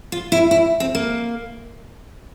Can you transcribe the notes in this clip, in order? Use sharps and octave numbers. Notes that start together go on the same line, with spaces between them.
F4
E4
E4
C4
A#3